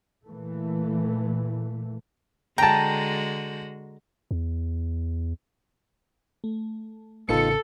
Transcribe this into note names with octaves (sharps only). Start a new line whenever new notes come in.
A#2 E3 A3
D3 G#3 F#4 G5 A5 A#5
E2
A3
A1 C#3 B3 D#4 F4 A4 C#7